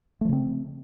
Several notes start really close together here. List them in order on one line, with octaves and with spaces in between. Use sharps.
A3 F3 C#3 C4